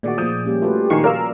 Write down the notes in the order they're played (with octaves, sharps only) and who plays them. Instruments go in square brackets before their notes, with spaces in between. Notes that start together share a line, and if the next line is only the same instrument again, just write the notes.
[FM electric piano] A#2 D#3 F#4 [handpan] A3 G#4 D5
[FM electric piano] A#2 F3 [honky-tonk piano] D#6 G6
[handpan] G3 A#3 C#4 [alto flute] G4
[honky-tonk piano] A3 [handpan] F4 F#4 B4
[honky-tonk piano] A#2 D#3 C7 [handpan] F3 [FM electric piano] G#5 C#6
[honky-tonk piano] A#4 [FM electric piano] D5 F5 E6